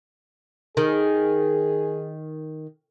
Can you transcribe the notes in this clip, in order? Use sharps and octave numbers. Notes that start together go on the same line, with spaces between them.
D#3 G#4